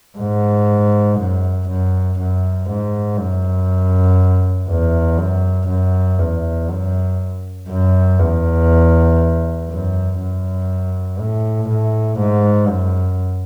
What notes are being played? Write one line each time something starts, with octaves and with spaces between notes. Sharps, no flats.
G#2
F#2
F#2
F#2
G#2
F#2
E2
F#2
F#2
E2
F#2
F#2
E2
F#2
F#2
A2
A2
G#2
F#2